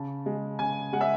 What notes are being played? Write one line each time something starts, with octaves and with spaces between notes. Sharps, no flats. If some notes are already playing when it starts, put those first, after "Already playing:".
Already playing: C#3 A5
G#3
C#3 G#5
G#3 F#5
E5